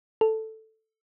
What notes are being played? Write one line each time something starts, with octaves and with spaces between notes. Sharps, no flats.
A4